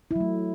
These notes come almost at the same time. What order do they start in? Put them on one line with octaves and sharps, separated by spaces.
E4 F#3 A3